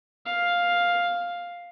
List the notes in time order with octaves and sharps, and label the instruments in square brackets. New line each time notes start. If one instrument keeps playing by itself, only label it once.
[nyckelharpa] F5